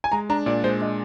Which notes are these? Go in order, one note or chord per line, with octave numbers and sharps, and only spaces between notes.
G#5
G#3 A#5
D4 A#5
A#2 D5
G#3 C5
D4 D#5